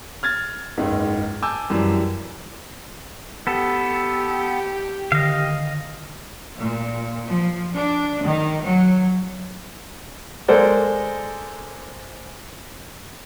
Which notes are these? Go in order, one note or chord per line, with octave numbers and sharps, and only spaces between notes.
F6 G#6 A6
F#1 C#2 G#2
G#5 A5 D6 E6 G6
F#2 E3 G3
B3 G4 A4
D3 D#3 D#5 F5
A#2
F3
D4
D#3
F#3
G#3 A4 A#4 C5 D5